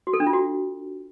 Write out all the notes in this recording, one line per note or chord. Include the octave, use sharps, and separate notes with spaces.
F#4
A4
D4
F4
F#4